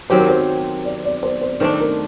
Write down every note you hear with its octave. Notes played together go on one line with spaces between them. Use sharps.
D#3 F#3 C4 G4 C5
A#4
C5
D5
D5
C5
C5
D#3 A3 D4 C5
A#4